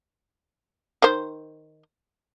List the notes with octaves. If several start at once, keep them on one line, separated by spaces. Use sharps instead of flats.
D#3 C5